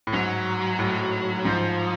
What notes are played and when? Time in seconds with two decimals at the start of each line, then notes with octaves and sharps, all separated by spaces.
0.07 A2
0.13 G#2 F#3
0.79 A2
1.45 G#2 F3